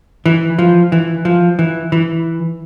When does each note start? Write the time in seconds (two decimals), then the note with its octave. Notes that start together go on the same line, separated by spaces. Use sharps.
0.26 E3
0.58 F3
0.92 E3
1.25 F3
1.59 E3
1.92 E3